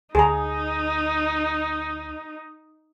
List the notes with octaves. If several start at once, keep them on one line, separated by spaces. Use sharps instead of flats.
D2 D#4 G#4 A#5